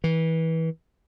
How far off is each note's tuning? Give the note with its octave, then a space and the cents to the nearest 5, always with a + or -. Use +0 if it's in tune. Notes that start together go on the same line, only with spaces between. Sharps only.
E3 -25